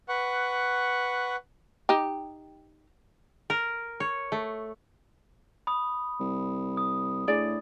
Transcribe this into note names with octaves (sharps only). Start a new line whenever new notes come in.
B4 F#5 C#6
D#4 G4
A#4
C#5
A3
B5 D#6
C2
D#6
A2 D4 G#4 D5